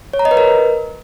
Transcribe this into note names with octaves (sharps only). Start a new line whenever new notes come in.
C#5
A#5
D#5
B4
A#4